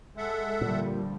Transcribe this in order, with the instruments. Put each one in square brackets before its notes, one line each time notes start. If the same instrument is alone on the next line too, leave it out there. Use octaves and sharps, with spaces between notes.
[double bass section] G#3 [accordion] A4 E5 F#5
[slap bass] A#2 [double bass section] D3 F3 G3